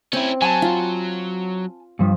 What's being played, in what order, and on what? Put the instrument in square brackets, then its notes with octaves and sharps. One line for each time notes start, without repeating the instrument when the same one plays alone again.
[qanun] C4 [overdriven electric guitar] C#4 E4
[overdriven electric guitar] F#3 [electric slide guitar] G#5 A5
[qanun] F4
[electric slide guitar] G2 F3